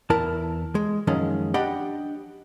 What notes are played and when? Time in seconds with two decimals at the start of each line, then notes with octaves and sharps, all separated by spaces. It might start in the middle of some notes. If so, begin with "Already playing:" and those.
0.10 E2 E4 A#4 A5
0.75 G#3
1.07 F#2 D#3 F3 G#3 C#4
1.54 D4 G4 D#5 F#5 G5 B5